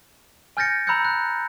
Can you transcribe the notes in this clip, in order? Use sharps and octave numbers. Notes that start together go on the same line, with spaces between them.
G#5 F6 G6 A6 A#6 C#7
A#5 B5 E6 F#6 G6 C#7
F#6